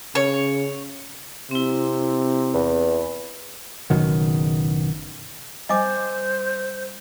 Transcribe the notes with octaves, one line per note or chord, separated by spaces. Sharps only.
C#3 C#5
C3 C4 E4
E2
F#1 B2 D#3 F#3
G3 C5 D#5 G#5 D6